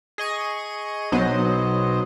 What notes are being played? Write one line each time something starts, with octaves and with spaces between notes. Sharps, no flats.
G#4 D#5 C#6 D#7
B1 F#3 B3 C5 D#5